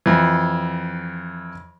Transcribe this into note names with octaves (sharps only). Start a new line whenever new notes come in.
F2 E3